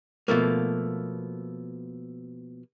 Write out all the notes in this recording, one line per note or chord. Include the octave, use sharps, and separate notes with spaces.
B2 F3 A3 A#3